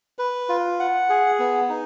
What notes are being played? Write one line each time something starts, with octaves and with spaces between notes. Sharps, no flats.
B4
F4
F#5
G#4
B3
D#4